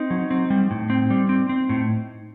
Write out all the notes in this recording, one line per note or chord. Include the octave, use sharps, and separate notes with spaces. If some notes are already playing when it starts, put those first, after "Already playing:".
Already playing: C4 D#4
F#3
C4
G3
A2
C4
G3
C4
C4
A2